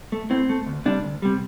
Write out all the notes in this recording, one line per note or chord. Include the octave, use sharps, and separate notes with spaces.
A3
A2 C4
A3
D2
C3 G3 D4
D2
C3 G3